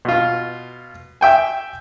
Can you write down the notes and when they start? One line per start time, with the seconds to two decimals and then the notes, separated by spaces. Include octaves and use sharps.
0.05 B2 F4
1.21 E5 G5 G#5